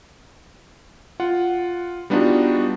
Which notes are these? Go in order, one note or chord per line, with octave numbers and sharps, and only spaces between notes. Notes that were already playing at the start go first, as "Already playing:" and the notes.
F4 F#5
G3 B3 D4 D#4 F4 F#4